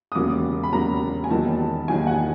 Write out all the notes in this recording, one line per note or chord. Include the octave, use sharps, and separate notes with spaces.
D#6
E1 D#2 C#3 F#3 A#3 D6
B5
E1 D#2 C#3 F#3 A#3 A#5
G#5
E1 D#2 D#3 F#3 A#3 A5
E1 D#2 D#3 F#3 A#3 G#5
F#5